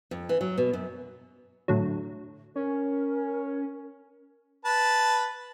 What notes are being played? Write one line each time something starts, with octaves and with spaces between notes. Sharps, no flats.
F2
E3
F#3
B2
F#2
A2 D3 F#3
C#4 A#4
B4 A5